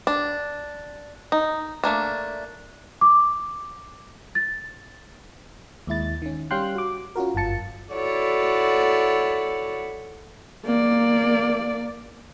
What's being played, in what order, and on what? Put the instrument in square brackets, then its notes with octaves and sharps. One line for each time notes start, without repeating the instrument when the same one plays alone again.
[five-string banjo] D4
D#4
A3 A#3 D4
[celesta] D6
A6
[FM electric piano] D#2 G#3 E4 A6
D#3 C#4
G3 C#4 F5 G5 C6 F#6
F#4 D6
C#4 F4 F#4 A#4
G1 F#2 F4 A5 C#7
[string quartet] E4 F#4 A4 C#5 D5
[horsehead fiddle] A#3 D5